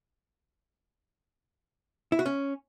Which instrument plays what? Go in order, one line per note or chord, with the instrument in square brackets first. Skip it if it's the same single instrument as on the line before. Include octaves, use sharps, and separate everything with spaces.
[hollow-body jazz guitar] E4
F#4
C#4